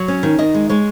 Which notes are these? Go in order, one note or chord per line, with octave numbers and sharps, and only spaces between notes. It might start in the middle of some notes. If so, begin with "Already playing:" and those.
Already playing: F#3 C#5
C#4
D#3
D#3 D#5
G#3
G#3 C#5